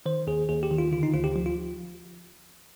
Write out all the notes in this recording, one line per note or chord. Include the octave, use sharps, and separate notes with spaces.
D#3 C5
D#2 G#4
D#2 G#4
G4
D#3
F4
D3 F4
D#4
D2 F4
G4
F3
F4